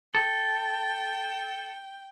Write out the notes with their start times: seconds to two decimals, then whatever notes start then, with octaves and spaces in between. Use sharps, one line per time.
0.15 A4 G5